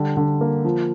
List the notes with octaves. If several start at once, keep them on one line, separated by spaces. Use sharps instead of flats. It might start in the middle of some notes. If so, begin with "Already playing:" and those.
Already playing: D3 G3
D3
A#3
F3